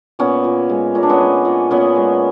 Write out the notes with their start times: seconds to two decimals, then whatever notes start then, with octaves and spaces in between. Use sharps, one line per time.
0.19 A#2 B3 C#4
0.44 A#2
0.69 G#3
0.95 A#2 C#4
1.03 D4
1.09 B3 C#4
1.20 G#3
1.45 A#2
1.71 A#2 B3 C#4
1.96 G#3